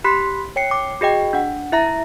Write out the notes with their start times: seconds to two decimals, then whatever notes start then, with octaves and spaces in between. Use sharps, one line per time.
0.04 G4 B5 C6 F#6 B6
0.56 C#5 G5 C7 C#7
0.71 D6
1.01 F#4 G#4 D#5 G5
1.33 D4 F#5
1.72 E4 E5 A#5 A#6